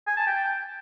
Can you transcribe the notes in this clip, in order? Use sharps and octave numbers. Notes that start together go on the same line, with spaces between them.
G#5
A5
G5